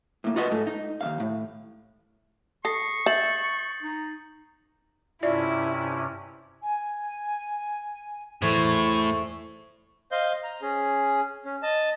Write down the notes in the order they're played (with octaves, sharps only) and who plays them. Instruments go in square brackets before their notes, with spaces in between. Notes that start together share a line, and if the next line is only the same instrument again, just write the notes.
[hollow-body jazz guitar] A2 A#3
F4 F#4 B4 D#5 F#5
G#2 A3
D#4
D#2 G#2 F5
A2
[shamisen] A4 [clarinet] C#6 [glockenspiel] D#6 A#6 C7
[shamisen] E5 [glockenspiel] G6 A6 F#7
[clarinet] D#4
[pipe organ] G2 C3 C#4 [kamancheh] E4 [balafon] F4 D5 E5
[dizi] G#5
[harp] E2 E3 [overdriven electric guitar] A2 [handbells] A4 C5 G#6 [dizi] C#6
[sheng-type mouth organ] C5 D#5 F5 G6
A#5
C#4 G#4
C#4
D#5 A5